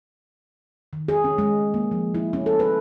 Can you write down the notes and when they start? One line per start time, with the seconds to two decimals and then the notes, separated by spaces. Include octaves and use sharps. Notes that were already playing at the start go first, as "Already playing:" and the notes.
0.93 D#3
1.08 G#4
1.24 C#4
1.38 G#3
1.74 A#3
1.91 F3
2.15 E4
2.33 C#4
2.46 A4
2.59 B4